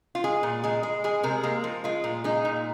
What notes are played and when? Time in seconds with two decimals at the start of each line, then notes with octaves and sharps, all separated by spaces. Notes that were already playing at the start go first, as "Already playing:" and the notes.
0.15 F4
0.24 G#3 G#4
0.43 A#2
0.64 G#3 G#4
0.83 G#3
1.04 G#3 G#4
1.23 C3 A#4
1.43 G#3 A#3
1.64 F3
1.84 G#3 F4
2.04 A#2
2.24 G#3 D#4
2.45 A#2